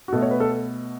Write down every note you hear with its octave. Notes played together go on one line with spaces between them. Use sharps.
F#4
B2 A3 A4
C#5
B4
A4